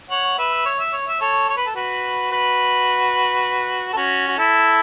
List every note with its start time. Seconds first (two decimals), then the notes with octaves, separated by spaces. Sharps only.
0.10 C#5 F#5
0.38 B4 E5
0.65 C#5
0.79 E5
0.93 C#5
1.07 E5
1.21 A4 C#5
1.49 C#5
1.57 B4
1.66 A4
1.75 F#4 B4
2.31 F#4 B4
3.93 A4
3.96 C#4 F#4
4.28 F#4
4.38 E4 A4